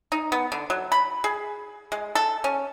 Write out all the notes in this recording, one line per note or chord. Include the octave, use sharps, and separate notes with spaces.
D#4
B3
D3
F#3
B5
G#4
G#3
A4
C#4